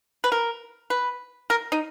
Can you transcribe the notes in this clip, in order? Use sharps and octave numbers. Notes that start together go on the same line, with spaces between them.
B4
A#4
B4
A#4
D#4